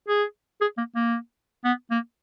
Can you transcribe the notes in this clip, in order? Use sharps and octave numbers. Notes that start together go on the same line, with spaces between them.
G#4
G#4
A#3
A#3
B3
A#3